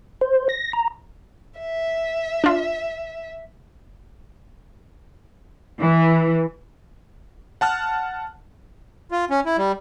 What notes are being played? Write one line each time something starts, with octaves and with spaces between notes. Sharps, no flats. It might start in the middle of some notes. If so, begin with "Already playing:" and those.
C5
A#6
A#5
E5
D4 F4
E3
F#5 A5 F6 F#6
F4
C#4
E4
G3